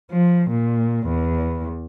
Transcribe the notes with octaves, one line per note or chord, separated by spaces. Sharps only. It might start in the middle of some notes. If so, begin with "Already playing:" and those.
F3
A#2
E2